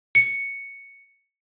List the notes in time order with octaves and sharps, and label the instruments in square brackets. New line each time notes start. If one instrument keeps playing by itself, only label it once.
[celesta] C#7